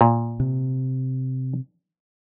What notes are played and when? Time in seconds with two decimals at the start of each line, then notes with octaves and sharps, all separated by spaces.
0.01 A#2
0.40 C3